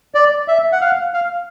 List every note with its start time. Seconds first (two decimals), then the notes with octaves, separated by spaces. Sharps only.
0.15 D5
0.48 E5
0.72 F#5
0.81 F5
1.14 F5